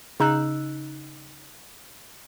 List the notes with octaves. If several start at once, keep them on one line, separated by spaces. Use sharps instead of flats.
C#3 D#4 E6 F#6